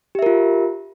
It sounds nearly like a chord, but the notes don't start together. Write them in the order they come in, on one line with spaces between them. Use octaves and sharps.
G4 E5 A#4 F4